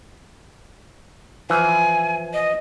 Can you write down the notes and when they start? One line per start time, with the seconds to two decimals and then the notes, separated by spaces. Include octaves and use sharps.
1.50 E3 F3 G#5
2.33 D#5